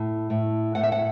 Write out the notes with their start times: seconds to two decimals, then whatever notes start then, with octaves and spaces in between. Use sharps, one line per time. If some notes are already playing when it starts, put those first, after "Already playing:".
Already playing: A2
0.30 A2
0.75 A2 F#5
0.83 E5
0.92 F#5